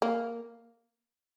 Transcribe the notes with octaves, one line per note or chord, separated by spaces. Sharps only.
A#3